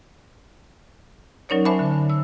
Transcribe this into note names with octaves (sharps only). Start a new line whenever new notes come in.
F#3 C#4 D#4 A#4 C#5 D5
C5 E5 G#5 A5 B5 D6
D3
D3
E6